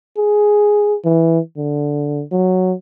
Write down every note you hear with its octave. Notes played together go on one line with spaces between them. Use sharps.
G#4
E3
D3
F#3